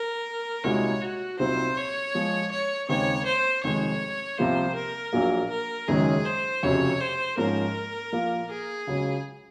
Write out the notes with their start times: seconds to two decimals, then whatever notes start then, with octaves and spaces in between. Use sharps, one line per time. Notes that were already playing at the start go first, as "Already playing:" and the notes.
Already playing: A#4
0.64 C2 A#2 G#3 D#4 F#4 C#5
1.01 F#4
1.39 C2 A#2 F#3 C4 D#4 C5
1.77 C#5
2.14 A#2 F3 G#3
2.52 C#5
2.89 D#2 C#3 G#3 C4 D#4 C#5
3.26 C5
3.63 F1 F2 D#3 G#3 C#5
4.38 C2 C3 F3 A#3 C5
4.76 A#4
5.13 A#1 A#2 F#3 A#3
5.50 A#4
5.88 F#1 F#2 D#3 G#3 C#4 G#4
6.25 C5
6.63 F#1 F2 C3 F#3 C#4 C#5
7.00 C5
7.37 G#2 F3 A#3 C#4 A#4
8.12 A#2 F3 A#3 F4
8.50 G#4
8.87 C#2 C#3 F#3 C#4